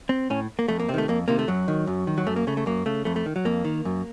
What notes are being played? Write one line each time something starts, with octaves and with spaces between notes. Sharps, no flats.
C4
A2 C#4
A#3
F2 A3
A#3
C3 C4
D#3 A3
F2 A#3
C3 D#3 A#3
A3
F#2 F#3
D#3
F#2
D#3
F#3
F#2 A3
A#3
C#3 A3
A3
F#2 A#3
C#3 A3
F2 A3
A3
D#3
F#3
F2 A#3
D#3
F#2